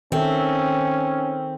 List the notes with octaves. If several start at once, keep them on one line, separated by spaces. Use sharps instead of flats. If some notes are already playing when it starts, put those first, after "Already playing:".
D#3 C4 C#4 A4 E5